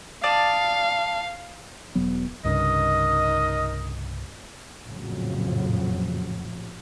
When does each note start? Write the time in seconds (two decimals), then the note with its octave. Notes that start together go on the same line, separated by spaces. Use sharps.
0.24 D5 F5 A5 D#6
1.95 E1 F#3 B3
2.44 C2 G2 C#3 D#4 A#4 D#5
4.85 A1 F2 A#2 C#3 F3 F#3